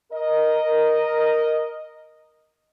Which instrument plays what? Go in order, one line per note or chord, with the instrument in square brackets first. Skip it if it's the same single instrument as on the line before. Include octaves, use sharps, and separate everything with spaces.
[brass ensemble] A#4 D#5